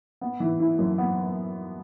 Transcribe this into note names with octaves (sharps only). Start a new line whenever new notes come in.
B3
E3
E4
F#2
B3